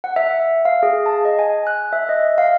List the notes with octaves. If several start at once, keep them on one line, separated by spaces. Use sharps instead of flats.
F#5
E5
F5
G#4
A5
D#5
G#5
F#6
E5
D#5
F5